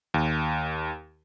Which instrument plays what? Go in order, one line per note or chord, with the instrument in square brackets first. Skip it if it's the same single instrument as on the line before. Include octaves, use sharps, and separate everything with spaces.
[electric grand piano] D#2